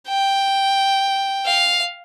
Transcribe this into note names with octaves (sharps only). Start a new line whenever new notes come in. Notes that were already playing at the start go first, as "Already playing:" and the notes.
G5
F5